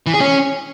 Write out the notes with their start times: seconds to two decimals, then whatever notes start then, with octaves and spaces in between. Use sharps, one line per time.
0.06 E3
0.14 G#4
0.21 C#4